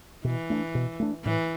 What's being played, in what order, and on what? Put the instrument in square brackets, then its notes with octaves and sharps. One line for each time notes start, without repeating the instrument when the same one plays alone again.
[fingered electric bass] B2 [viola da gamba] E3
[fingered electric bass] A3 D4
B2
A3 D4
[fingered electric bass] A2 [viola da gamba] E3